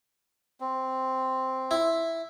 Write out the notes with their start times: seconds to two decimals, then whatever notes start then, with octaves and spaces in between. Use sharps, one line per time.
0.60 C4
1.71 E4